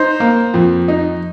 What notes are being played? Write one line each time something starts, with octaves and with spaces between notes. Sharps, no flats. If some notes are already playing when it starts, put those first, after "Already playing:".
Already playing: D#4 C5
A#3
F2
D#4